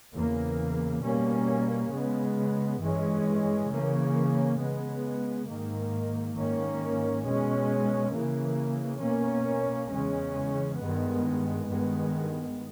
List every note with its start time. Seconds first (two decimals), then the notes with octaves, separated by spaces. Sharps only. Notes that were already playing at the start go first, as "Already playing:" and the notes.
0.14 E2 C#3 E3 A#3
1.03 B2 G3 A#3 C#4
1.92 C#3 G#3 B3
2.81 G2 E3 G#3 C#4
3.70 C#3 E3 A#3 C#4
4.58 C#3 G#3 B3
5.48 G#2 D#3 A#3
6.37 G#2 D#3 A#3 C#4
7.26 B2 G#3 C#4
8.14 C#3 E3 A#3
9.03 B2 A#3 C#4
9.92 E2 C#3 G#3 C#4
10.81 G2 D#3 G#3 B3
11.70 G2 D#3 G#3 B3